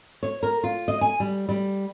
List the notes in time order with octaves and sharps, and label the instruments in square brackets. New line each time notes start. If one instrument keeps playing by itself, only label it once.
[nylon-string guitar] C#5
A#4
F4
D#5
G#5
G3
G3